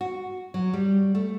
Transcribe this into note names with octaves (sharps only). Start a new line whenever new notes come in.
F#4
F#3
G3
A3